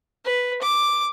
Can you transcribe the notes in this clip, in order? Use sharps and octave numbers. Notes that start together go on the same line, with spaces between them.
B4
D6